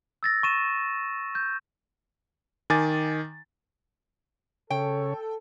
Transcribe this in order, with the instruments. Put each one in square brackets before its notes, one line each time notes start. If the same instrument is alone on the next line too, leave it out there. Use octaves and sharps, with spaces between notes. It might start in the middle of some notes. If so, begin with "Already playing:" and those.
[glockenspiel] E6 A6 A#6
C#6 D#7 E7
G6
[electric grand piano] D#3 G#5 D6 A6
[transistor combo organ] C#3 C#5 [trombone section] A4 [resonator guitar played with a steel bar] G5